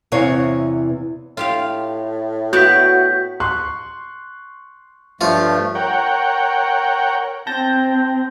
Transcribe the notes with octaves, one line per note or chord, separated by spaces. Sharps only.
E2 C3 E3 C#5 F5
A2 F4 G4 F5
B3 F#4 D5 G6 B6
C6 C#6 F#6
G2 F3 A3 F4 C#5
A#4 C#5 F#5 G5
C4 A5 G6 A#6